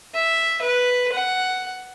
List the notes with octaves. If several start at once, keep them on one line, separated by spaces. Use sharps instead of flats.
E5
B4
F#5